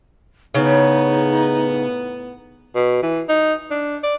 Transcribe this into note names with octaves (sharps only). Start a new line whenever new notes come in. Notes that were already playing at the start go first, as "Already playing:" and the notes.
A2 C#3 B3 D#4
B2
E3
D#4
D4
D5